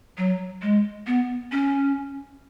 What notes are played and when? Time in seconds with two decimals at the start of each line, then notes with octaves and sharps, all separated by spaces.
0.18 F#3
0.62 G#3
1.07 B3
1.52 C#4